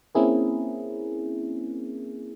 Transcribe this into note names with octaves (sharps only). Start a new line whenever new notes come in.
A#3 C4 C#4 E4 G#4 A#4